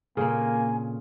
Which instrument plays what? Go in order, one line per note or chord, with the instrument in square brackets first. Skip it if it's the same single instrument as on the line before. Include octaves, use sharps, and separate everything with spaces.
[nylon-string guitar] A#2 A4 [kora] C#3 C4 [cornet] A#3 [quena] G#5